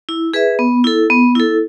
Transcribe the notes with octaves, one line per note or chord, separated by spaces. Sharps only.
E4
G#4 B4 E5
B3
E4 A4
B3
E4 A4